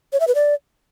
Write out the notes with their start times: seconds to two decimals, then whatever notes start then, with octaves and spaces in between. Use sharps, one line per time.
0.13 C#5
0.20 E5
0.28 B4
0.35 D5